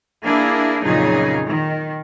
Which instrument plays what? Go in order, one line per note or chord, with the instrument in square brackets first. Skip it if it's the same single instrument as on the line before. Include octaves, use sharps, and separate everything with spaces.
[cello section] A#3 D4 E4 G#4
F2 A#2 C#3 F#3 D#4 G#4
D#3